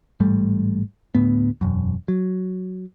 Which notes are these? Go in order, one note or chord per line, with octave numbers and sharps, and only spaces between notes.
A1 G#2 G3 A3
D2 A2 B3
E1 F#2
F#3